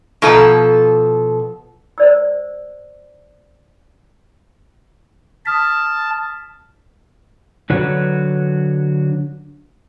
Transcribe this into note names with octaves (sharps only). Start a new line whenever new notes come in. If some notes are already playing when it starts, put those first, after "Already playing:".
B2 F3 A4 A#5
C5 D5 E6
A5 D#6 F6 B6
D3 F#3 D4 F#4 B4 C#5